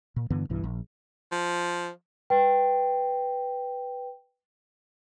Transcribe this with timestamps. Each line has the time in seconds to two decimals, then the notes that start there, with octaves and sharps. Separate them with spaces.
0.16 A#2
0.30 G2 D3 E3 B3
0.50 B1 G2 E3
0.64 A#1
1.32 F3
2.30 B4 G5